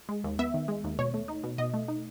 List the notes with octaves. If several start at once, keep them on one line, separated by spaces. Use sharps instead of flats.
G#3
D#2
B3 E5
D#3
G#3
D#2
B2 C#5
A3
D#4
B2
B2 D#5
A3
D#4